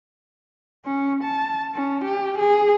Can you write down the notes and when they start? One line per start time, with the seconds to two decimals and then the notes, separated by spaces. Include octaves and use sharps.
0.86 C#4
1.24 A5
1.75 C#4
2.05 G4
2.39 G#4